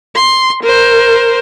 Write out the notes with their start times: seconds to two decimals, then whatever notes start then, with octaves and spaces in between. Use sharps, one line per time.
0.15 C6
0.63 A#4 C5